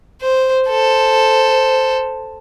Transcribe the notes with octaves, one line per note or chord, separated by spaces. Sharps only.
C5
A4 C5